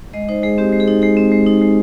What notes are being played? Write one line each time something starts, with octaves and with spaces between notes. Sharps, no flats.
G#3 D#5
D#4 C5
G#3 G#4
C4 G4
G#3
G#4
D#4
G#3 G#4
C4
G#3
D#4
G#3